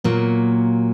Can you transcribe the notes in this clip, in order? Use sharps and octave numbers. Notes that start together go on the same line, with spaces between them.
A#2 F#3 A#3